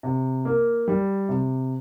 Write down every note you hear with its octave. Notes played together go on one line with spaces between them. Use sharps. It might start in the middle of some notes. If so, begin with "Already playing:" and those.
C3
A#3
G3
C3